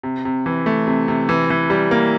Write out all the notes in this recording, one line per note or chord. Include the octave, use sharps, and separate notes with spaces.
C3
C3
E3
A3
C3
C3
E3
E3
G3
A#3